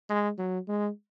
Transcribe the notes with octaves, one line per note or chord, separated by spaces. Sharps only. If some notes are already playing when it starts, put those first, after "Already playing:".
G#3
F#3
G#3